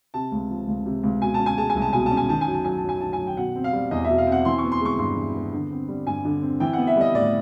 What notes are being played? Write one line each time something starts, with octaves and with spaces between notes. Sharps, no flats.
C3 A5
C#2
F3
C#2
C3
C#2
B2 G#5
A5
C#4
G#5
G#3 A5
G#5
C2
A5
B2 G#5
A5
C#4
G#5
D#3 A5
G#5
F#2
A5
F#3 G#5
A5
F#2 G#5
D#3 A5
G#5
F#2
G5
B2 F#5
C4
F5
G3
E2 D#5
E5
B2
F5
C4
F#5
E3 C6
C#6
B3
C6
G#3 C#6
G2 C6
E3
B3
D3
C4
G3
G2 G#5
D3
C4
E3 G5
F#5
B3
E5
G3 D#5
A2 D5